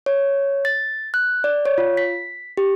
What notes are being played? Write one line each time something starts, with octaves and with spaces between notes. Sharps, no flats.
C#5
A6
F#6
D5
C#5
F4
B6
G4